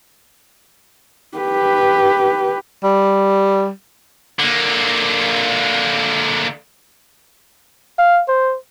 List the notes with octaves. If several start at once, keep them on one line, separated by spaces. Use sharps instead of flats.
G4 B4
G3
D3 A#3
F5
C5